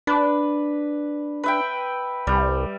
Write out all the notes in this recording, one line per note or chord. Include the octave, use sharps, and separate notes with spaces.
D4 B4
B4 E5 G5
C2 G3